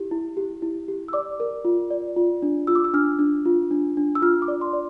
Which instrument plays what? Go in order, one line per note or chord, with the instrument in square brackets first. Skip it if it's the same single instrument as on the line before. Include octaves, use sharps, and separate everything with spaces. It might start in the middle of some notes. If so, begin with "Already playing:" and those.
Already playing: [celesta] E4 G4
E4
G4
E4
G4
E6
D5 D6
A#4
F4
D5
F4
D4
F4 E6
D6
E6
D4 F6
D4
F4
D4
D4
E6
F4 F6
D6
D5
C6
D5